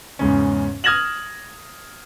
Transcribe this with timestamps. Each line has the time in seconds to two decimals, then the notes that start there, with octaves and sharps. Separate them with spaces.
0.19 E2 G#2 C#3 C#4
0.84 D#6 F6 G#6 A#6 E7 F#7